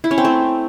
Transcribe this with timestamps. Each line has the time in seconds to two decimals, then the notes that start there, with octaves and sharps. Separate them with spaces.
0.04 E4
0.11 C#4
0.18 C4
0.25 A3